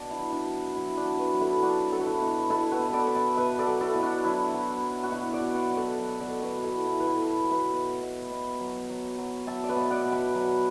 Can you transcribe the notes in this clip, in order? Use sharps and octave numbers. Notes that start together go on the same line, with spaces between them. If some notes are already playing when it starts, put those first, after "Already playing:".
Already playing: B2 D4
E4
F#3
D4
F#3
F#3 E4
D4 F#4
F#3
F#4 B4
F#3
E4 A4
F#3 D4 F#4
F#3 A4
F#4
E4
B2
B2 E4 A4
F#4 B4
B2
A4 D5
B2 B5
E5 A5
B2 B4 E5
A4 D5
F#3
E4 A4
B2
D4 F#4
F#3 E4
F#3
F#3
F#4
B2 E4
D5 F#5
B2
D5 F#5
F#3
A4 D5
F#3
A4 D5
B2
F#4 B4
B2
E4 A4
F#3 E4
B4
E4 A4
B2
F#3
B4 E5
B2
B2
B2
F#3
F#3
F#3
F#3 E5 A5
D5
B4 E5
B2
D5 F#5
B2
F#5 B5
F#3